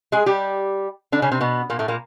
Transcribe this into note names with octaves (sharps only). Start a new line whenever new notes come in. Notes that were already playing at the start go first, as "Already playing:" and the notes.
G#3 G#4
G3 G4
D3 D4
C#3 C#4
C3 C4
B2 B3
A#2 A#3
A2 A3
A#2 A#3